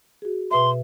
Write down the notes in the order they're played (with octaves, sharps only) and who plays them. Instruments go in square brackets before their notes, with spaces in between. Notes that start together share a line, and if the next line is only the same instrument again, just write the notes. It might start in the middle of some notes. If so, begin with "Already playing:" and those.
[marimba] F#4 G#4
[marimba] B2 B4 E5 [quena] C6